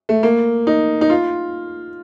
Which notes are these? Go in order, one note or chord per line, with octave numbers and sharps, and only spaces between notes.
A3
A#3
D#4
D#4
F4